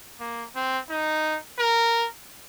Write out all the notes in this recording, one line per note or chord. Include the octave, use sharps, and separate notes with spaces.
A#3
C4
D#4
A#4